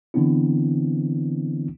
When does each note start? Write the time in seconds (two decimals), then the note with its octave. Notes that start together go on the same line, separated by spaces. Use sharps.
0.14 D3 E3 B3 C4 D4 E4